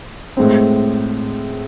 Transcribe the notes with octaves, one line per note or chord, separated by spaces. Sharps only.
A2 G#3 C4